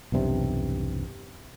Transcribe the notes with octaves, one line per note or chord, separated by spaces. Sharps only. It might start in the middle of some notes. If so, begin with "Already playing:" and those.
B1 E2 G2 C3